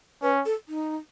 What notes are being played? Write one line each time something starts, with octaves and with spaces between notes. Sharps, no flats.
C#4 B4
A4
D#4